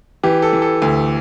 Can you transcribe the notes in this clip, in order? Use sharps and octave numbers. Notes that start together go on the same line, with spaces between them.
E3 G4
A4
E3
A4
D2